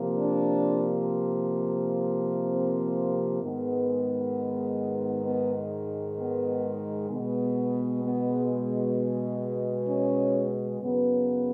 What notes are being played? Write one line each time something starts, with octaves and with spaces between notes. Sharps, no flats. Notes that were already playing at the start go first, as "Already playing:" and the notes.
Already playing: C3 F3 A#3
D4
C4
G#2 D#3 G#3 B3
B3
B3
B2 G#3 B3
B3
C#4
F#2 C#3 F#3 B3